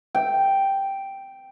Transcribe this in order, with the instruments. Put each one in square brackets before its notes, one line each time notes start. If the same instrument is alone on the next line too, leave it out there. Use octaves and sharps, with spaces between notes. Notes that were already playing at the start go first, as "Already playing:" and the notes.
[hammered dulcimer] G5